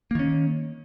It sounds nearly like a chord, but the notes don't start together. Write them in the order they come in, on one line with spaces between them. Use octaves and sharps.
A#3 D#3 C#4